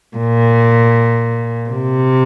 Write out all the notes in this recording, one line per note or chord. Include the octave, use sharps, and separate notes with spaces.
A#2
C3